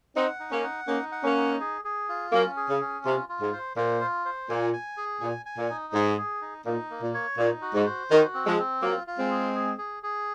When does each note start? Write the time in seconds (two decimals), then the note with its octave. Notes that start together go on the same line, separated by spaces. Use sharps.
0.15 C4 D#4 F#5
0.40 D#4
0.51 A#3 C#4
0.64 F#5
0.88 A#3 C#4 D#4
1.12 F#5
1.24 A#3 C#4
1.37 D#4
1.60 G#4
1.84 G#4
2.09 F4
2.32 F#3 A#3 C#4
2.57 G#4
2.69 C#3
2.81 C#4
3.05 C3 F4
3.29 F4
3.41 G#2
3.53 C5
3.77 A#2 C5
4.01 F4
4.25 C5
4.49 A#2 G#5
4.73 G#5
4.97 G#4
5.21 A#2 G#5
5.46 G#5
5.58 A#2
5.70 D#4
5.93 G#2 G#4
6.18 G#4
6.42 D#4
6.65 A#2 D#4
6.90 A#3
7.02 A#2
7.14 C#5
7.38 A#2 D#4
7.62 F#4
7.74 G#2
7.86 C5
8.10 D#3 F#4
8.34 C4
8.46 F3 G#3
8.58 C4
8.82 F#3 A#3 F4
9.07 F4
9.19 G#3 C4
9.31 G#4
9.55 G#4
9.78 G#4
10.03 G#4